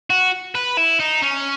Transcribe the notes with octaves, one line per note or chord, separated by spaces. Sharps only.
F#4
B4
E4
D#4
C#4